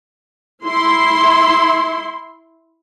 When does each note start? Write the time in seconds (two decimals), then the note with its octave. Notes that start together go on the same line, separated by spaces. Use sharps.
0.65 E4 C6